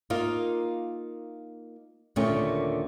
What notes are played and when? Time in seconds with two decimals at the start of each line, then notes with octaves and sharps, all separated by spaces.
0.10 A#3 D#4 F4
2.16 D#2 A#2 D3 A3 C#4